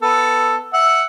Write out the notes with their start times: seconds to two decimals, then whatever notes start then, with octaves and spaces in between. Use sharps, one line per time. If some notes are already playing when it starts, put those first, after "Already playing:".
0.02 B3 A4
0.73 E5 F#5